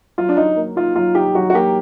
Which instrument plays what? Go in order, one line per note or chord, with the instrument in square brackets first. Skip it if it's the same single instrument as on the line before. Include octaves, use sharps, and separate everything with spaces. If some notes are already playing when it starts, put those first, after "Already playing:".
[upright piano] F#3 [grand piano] F4
[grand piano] D4
[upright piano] F#3 [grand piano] D#4
[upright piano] A#3
[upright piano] D#4 [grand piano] F4
[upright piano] F#3 [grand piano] F4
[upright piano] D#4 [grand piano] G4
[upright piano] F#3 [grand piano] F#4
[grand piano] F#4
[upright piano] A#3 [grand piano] G4